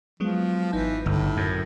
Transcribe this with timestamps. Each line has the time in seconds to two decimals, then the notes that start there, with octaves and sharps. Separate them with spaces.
0.20 F3 F#3 G#3 B3
0.73 G#1 E3 D#4 G6
1.06 G1 A2
1.37 F#2